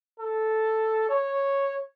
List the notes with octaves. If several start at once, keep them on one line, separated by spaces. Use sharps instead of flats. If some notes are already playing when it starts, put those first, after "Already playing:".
A4
C#5